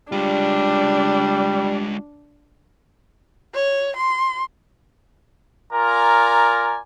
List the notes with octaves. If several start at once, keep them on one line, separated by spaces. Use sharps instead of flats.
G3 G#3 D4 F4
C#5
C6
F4 A#4 D5 G#5 A#5